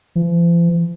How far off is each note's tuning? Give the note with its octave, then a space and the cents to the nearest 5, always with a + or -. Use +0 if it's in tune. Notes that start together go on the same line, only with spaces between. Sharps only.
F3 -45